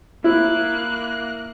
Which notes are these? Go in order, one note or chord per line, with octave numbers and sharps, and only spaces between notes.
A#3 E4 F#6